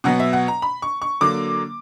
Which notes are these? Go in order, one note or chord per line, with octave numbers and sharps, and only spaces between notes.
B2 F#3 B3 F#5
E5
F#5
A#5
B5
C#6
C#6
D3 F#3 A#3 D6